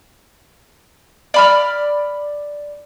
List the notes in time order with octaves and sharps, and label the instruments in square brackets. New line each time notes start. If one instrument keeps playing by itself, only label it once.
[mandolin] D5 B5 F6